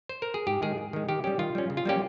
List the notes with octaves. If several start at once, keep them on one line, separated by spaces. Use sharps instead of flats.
C5
A#4
G#4
G#2 G4
D#3 G#3 G#4
G#2
D#3 G#3
D#3 G4
G3 C#4 G4
D#3 F4
G3 C#4
C#3
F4
G3 A#3 C#4 G4